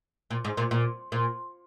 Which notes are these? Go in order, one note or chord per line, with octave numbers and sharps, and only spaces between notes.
A#2
G#2
A#2
A#2
A#2